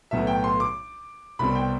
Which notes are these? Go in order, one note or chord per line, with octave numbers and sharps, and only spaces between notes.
B1 A2 F#3 B3 E5
G5
C6
D6
C2 B2 G3 C4 B5
G5